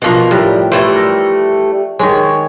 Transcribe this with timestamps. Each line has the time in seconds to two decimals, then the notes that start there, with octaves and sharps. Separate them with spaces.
0.02 B2 F3 A#3 D4 F#5
0.31 A2 G3 A#4 B4
0.72 E3 G3 A3 C5 C#5
0.96 A#4
1.99 D#3 G#3 C#5